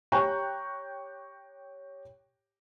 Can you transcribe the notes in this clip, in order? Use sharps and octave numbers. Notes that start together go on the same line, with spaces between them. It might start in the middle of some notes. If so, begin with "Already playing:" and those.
G4 C#5 G5 A#5 C#6 F#6